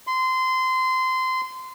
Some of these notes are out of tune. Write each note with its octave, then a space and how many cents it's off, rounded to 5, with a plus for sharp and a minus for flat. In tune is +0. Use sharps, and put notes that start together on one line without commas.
C6 -20